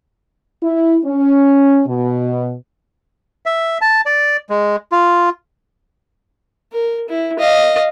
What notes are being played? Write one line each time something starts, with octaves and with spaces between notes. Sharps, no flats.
E4
C#4
B2
E5
A5
D5
G#3
F4
A#4
E4
D#5 F5